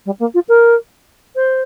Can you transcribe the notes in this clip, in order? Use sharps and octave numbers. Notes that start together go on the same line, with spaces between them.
G3
A#3
F4
A#4
C5